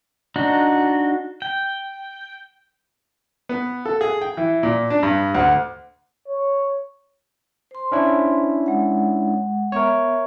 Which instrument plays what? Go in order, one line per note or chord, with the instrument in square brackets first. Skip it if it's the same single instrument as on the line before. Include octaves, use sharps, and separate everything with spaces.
[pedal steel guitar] D4 D#4 F#4
G5
[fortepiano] B3
A4
G#4
G5
E3
A#2
D4
G2
D2
[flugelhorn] C#5
[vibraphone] C5 C6
[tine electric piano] C#4 D4 E4
[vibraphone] G#3 F#5
[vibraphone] B3 E5 [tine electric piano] A#4 C#5